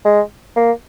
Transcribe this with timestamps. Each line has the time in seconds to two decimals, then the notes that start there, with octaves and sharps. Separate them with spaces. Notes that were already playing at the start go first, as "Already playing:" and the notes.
0.05 G#3
0.56 A#3